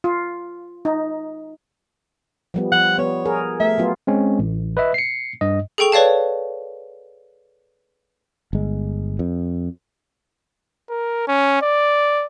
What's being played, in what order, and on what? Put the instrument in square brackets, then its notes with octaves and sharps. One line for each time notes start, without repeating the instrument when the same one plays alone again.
[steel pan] F4
D#4
[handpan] F3 G3 B3
[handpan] F3 [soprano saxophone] F#5
[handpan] B3 [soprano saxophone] C#5
[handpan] G#4 A#4
[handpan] A3 [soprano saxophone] E5
[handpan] F#3 B3 F4
[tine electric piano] G#3 C4 C#4
A1
B4 D#5 E5
C7 C#7
G2 D#5
[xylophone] G#4 A4 G5 C#6 F7
B4 C#5 D5 F5 A5
[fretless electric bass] G1 G#3
F2
[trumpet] A#4
C#4
D5